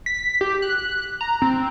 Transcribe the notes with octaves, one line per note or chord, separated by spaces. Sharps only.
B6
G4
F#6
A#5
C4